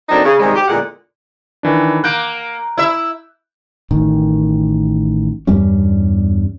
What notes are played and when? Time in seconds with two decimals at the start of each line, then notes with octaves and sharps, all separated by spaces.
0.09 D3 F#3 A#3 C4 D4 D#4
0.24 C#3
0.40 C3 D#3 G3 G#3
0.55 G4
0.68 E2 A#2 D3 G#3 F#5
1.63 D#3 E3 D4
2.04 A#3 F#6 G6 D7
2.78 E4 E5
3.91 A1 D#3
5.47 E2 G2 G3 C#4